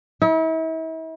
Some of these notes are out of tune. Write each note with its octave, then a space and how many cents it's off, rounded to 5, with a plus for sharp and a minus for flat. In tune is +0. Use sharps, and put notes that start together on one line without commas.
E4 -40